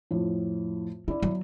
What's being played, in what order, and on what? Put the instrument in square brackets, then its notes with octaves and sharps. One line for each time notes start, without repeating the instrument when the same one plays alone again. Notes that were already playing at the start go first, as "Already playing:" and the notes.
[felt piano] F2 A2
[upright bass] C#4 [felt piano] E4 D5
[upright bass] F#3